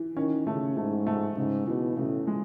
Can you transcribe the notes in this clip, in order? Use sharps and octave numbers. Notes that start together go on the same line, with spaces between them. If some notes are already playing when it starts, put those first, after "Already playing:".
Already playing: E3
D#3 C#4
C#3 A3
G#2 A3
A3
G#2 C#3
B2 E3
A2 C#3
G#3